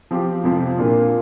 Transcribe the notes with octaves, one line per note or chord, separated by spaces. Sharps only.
F3 C4 G4
F2 C3 F3 C4
A#2 A#3 D4 F4